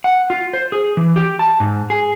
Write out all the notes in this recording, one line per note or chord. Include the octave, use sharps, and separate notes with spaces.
F#5
F4
C5
G#4
E3
G4
A5
G#2
G#4